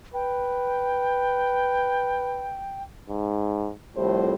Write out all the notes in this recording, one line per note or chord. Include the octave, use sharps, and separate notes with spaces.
B4 G5
G#2
C2 F2 A2 G3 C5